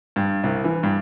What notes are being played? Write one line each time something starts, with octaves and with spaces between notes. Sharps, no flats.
G2
C2
E3
G2